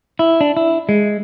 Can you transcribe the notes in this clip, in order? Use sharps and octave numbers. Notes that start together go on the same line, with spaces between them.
E4
D4
E4
G#3